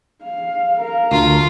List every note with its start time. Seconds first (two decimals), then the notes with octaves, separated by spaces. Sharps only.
0.23 F5
0.77 A#4 F5
1.12 D2 F4